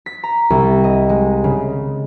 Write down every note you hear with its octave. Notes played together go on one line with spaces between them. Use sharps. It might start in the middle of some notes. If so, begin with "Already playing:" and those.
B6
A#5
C2
D#5
G#3
C#3